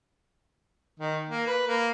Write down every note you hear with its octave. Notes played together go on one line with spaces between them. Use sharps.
D#3
A#3
B4
A#3